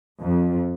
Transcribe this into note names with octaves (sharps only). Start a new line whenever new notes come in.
F2